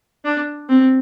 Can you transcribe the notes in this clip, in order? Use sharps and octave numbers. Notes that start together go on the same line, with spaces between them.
D4
C4